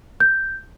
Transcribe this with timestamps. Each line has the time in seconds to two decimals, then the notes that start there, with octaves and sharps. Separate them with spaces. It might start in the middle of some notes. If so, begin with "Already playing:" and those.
0.20 G6